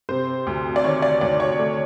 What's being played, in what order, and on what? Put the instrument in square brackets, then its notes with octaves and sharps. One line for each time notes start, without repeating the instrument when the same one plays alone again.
[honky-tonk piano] C3 C5
D2
D5
D#3 C#5
D5
D2 D5
C#5
A3